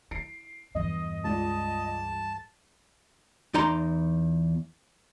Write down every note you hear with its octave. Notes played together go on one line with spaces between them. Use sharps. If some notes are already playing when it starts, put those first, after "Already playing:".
E4 C7 D7
E2 G2 E3 D#5
C#2 F4 D5 A5
E2 D#4 D5 A#5 C6